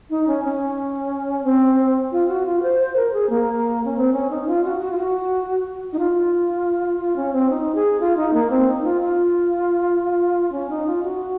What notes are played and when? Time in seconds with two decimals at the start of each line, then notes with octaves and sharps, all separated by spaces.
0.10 D#4
0.27 C#4
0.45 C#4
1.44 C4
2.12 F4
2.29 F#4
2.46 F4
2.62 C5
2.79 C5
2.96 A#4
3.13 G#4
3.29 A#3
3.85 C#4
3.97 C4
4.13 C#4
4.30 D#4
4.47 F4
4.64 F#4
4.81 F#4
4.91 F4
4.98 F#4
5.93 D#4
5.99 F4
7.00 F4
7.16 C#4
7.33 C4
7.50 D#4
7.75 G#4
8.00 F4
8.17 D#4
8.33 A#3
8.50 C4
8.68 D#4
8.84 F4
9.01 F4
10.52 C#4
10.70 D#4
10.86 F4
11.03 F#4